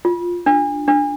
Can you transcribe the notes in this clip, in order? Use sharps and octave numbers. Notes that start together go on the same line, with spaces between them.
F4
D4
D4